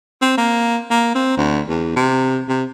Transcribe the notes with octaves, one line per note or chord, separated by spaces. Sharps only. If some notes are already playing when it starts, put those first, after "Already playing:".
C4
A#3
A#3
C4
D2
E2
C3
C3